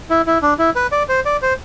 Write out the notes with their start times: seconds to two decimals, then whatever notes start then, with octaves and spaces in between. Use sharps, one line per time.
0.10 E4
0.27 E4
0.42 D4
0.59 E4
0.75 B4
0.92 D5
1.09 C5
1.25 D5
1.42 C5